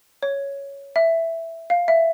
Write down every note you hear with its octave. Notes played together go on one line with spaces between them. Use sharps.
C#5
E5
F5
E5